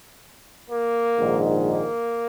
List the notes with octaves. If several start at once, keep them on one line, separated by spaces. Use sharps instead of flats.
A#3
A#1 G#2 D#3
A#3